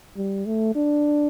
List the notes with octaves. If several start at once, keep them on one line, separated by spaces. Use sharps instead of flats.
G3
A3
D4